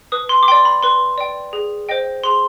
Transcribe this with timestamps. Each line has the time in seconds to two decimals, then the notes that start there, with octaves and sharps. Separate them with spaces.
0.12 B4 D#6
0.29 C6
0.43 D6
0.48 D5 G5 C6
0.65 B5
0.83 B4 C6
1.18 D5 G5
1.53 G#4
1.89 C5 D#5 G5
2.24 G#4 C6